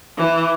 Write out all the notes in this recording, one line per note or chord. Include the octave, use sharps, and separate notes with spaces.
E3